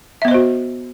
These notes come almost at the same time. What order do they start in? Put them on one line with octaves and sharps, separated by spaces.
E5 B3 D#5 C5 F#4